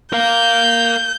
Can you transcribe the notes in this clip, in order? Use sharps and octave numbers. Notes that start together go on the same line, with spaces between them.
A#4 F5 G6